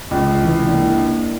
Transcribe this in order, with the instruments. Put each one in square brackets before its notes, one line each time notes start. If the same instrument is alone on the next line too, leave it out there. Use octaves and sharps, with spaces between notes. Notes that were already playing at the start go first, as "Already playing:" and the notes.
[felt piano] C#2
[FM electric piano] C3 E3 G#3
A#3 D4 E4